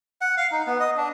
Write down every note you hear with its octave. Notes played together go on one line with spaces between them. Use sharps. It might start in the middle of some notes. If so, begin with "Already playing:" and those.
F#5
F5
D#4
B3
D#5
D4